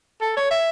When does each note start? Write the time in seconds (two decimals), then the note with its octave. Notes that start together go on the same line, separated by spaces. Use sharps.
0.21 A4
0.37 C#5
0.51 E5